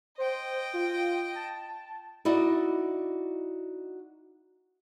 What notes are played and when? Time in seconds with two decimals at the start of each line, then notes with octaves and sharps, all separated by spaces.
0.18 C5 D#5 G5
0.74 F4
1.35 A5
2.25 D#4 E4 F#4 D5 D#5